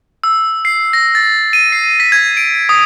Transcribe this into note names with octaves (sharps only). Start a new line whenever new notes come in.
E6
C7
A#6
A6
D#7
C7
B6
G#6
D7
D#6